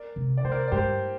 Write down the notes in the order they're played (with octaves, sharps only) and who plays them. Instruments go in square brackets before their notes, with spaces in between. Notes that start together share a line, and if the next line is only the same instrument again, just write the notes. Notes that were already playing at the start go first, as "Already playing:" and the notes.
Already playing: [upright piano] A#4 D5
[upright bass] C3
[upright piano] D5
[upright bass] C3 [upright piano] C5
[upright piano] A#4 D5
D5
[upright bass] G2 [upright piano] G4 C5